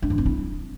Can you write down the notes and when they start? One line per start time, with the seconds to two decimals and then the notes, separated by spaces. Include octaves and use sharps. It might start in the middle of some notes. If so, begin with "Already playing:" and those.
0.02 D4
0.10 E3
0.18 C4
0.26 E4